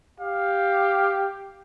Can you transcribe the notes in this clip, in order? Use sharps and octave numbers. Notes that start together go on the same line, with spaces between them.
G4 F5